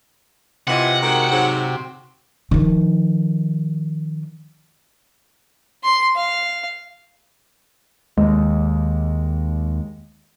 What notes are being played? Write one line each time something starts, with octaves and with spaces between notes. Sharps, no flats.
C3 E3 F4 D#5 F#5
D#3 G#3 F#4 G5
G#2 F#3
D#3 F3
C6
F5
D#2 G#3